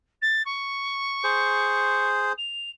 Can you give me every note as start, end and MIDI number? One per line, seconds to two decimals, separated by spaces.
0.21 0.42 93
0.45 2.07 85
1.24 2.32 68
1.24 2.32 72
2.38 2.70 101